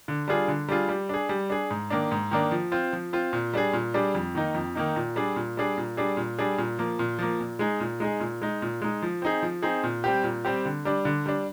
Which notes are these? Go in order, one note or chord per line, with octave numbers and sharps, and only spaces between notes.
D3
G3 D4 F4 G#4
D3
G3 D4 F4 G#4
G3
D4 G#4
G3
D4 G#4
G#2
D#3 A#3 D4
G#2
D#3 A#3 D4
F3
C4 F4
F3
C4 F4
A#2
G3 D4 G#4
A#2
G3 D4 G#4
F2
D#3 A#3 D#4
F2
D#3 A#3 D#4
A#2
G3 D4 G#4
A#2
G3 D4 G#4
A#2
G3 D4 G#4
A#2
G3 D4 G#4
A#2
F3 A#3
A#2
F3 A#3
A#2
G#3 D#4 G#4
A#2
G#3 D#4 G#4
A#2
G#3 D#4
A#2
G#3 D#4
F3
C4 D#4 G#4
F3
C4 D#4 G#4
A#2
G3 C4 G4
A#2
G3 C4 G4
D3
G3 D4
D3
G3 D4